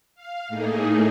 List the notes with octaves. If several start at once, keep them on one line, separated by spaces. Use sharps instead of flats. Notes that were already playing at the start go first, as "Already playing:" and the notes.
F5
A2 A3 A#3 D#4 G#4